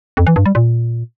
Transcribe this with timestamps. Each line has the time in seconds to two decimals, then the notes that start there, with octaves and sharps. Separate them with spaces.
0.17 F2
0.27 E3
0.36 G2
0.46 G3
0.55 A#2